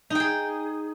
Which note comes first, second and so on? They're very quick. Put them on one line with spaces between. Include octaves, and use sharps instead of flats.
D#4 G5 G#4